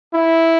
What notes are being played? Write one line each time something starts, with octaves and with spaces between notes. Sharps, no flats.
E4